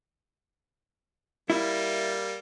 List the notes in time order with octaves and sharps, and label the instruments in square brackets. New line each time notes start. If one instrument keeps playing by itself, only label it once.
[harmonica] G3 A#3 [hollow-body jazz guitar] E4